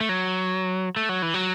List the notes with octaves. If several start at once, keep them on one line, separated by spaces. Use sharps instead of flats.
A3
F#3
A3
F#3
E3
F#3